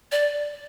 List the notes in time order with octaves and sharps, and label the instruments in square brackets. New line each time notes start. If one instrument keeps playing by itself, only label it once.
[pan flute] D5